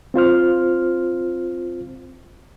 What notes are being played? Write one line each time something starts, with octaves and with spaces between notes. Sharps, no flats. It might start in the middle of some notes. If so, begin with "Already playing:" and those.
C4 F4 C5 F6